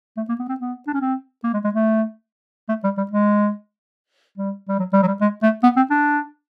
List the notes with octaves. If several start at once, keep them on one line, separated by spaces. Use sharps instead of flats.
A3
A#3
B3
C4
B3
D4
C#4
C4
A#3
G#3
G#3
A3
A3
G3
G3
G#3
G3
G3
F#3
G3
F#3
G3
G#3
A3
B3
C4
D4